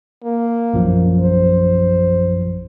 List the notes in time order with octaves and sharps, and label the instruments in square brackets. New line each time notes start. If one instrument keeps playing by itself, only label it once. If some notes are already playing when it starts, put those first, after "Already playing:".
[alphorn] A#3
[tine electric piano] A#1 F#2 F3
[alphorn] C5